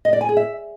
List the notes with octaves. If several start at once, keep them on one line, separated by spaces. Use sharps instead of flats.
D#5
D5
G#5
G#4
E5